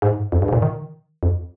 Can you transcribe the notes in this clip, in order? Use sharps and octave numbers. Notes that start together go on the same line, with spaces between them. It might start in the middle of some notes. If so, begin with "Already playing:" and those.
G#2
F2
G2
G#2
A#2
D#3
F2